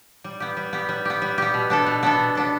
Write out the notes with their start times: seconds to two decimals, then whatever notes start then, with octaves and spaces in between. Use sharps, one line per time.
0.24 G3
0.40 B3 G4
0.57 G3
0.73 B3 G4
0.89 G3
1.05 B3 G4
1.22 G3
1.38 B3 G4
1.54 B2
1.70 B3 D4 A4
1.86 B2
2.03 B3 D4 A4
2.19 B2
2.35 B3 D4 A4